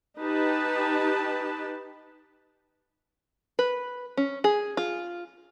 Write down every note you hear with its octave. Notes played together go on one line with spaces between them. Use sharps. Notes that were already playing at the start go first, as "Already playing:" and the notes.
D#4 G4 B4 A5
B4
C#4
G#4
F4